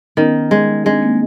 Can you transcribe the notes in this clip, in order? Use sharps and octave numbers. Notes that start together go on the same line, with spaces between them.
D#3 B3 C#4
G#3
G#3 C4 D4
A#3 C4